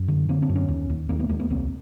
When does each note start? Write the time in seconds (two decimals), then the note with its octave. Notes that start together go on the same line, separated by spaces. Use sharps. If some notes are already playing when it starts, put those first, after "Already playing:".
Already playing: F#2
0.08 D3
0.29 D3 A#3 C4
0.42 C4 D4
0.49 F#2
0.55 B3 C#4
0.68 D#2
0.90 D#2
1.09 D#2 A#3 C4
1.19 A3 B3
1.29 D#2 G#3 A#3
1.39 A3 B3
1.50 C2 A#3 C4